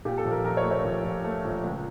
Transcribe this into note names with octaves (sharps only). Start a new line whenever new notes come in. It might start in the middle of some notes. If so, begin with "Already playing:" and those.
A#2 G4
A4
A#1
A#4
A#1 A#4
C#5
A3
C#5
A#1
A#1
A3
A#1
C#2